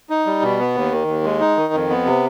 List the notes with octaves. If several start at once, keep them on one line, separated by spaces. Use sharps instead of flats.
D#4
G3
B2
B3
D#2
D#3
D#2
G#3
D#4
D#3
F2
B3
C3